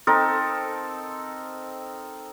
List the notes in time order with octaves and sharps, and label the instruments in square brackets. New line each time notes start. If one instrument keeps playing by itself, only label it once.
[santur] C4 D#4 A4 A#4